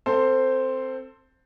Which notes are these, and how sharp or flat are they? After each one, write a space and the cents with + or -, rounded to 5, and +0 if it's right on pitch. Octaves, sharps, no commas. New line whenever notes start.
C4 +0 A4 +25 C5 +0